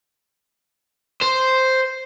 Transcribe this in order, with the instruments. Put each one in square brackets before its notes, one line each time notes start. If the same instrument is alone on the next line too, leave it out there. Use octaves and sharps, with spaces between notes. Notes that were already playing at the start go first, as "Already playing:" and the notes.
[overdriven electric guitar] C5